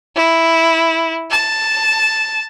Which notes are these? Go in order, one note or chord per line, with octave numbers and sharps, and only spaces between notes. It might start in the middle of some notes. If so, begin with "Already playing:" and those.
E4
A5